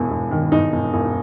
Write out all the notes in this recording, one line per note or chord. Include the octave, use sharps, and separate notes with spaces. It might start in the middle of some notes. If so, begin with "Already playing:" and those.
Already playing: E1 E2
E1
D#3
E2 D#4
E1
E1